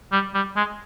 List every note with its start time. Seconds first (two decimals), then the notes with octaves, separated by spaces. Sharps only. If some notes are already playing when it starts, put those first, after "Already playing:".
0.12 G3
0.34 G3
0.56 G#3